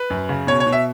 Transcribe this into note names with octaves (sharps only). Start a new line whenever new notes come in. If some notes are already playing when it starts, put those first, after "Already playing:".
Already playing: B4
F#2
C#3
B2 C#5
C#5
B2
E5